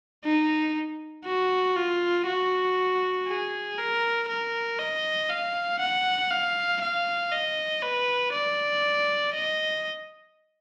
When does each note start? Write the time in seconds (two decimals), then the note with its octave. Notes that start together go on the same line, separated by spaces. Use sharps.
0.24 D#4
1.25 F#4
1.76 F4
2.27 F#4
3.28 G#4
3.78 A#4
4.29 A#4
4.79 D#5
5.30 F5
5.80 F#5
6.31 F5
6.82 F5
7.32 D#5
7.82 B4
8.33 D5
9.35 D#5